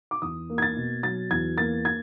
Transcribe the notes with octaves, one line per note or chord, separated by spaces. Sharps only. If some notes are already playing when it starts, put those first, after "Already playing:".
D6
E2 D#6
A#3
G#6
A6
B2
F#3 A6
E2 G#6
A#3 A6
G#6